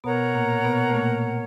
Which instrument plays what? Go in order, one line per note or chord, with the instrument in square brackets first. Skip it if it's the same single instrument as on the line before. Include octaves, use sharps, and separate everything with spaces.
[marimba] B2 B3 [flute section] A#4 C#5 F#5 A#5
[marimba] A#2 A#3
B2 B3
A3
A#2 A#3